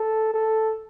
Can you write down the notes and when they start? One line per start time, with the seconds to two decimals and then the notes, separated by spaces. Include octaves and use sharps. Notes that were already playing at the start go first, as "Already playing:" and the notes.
Already playing: A4
0.34 A4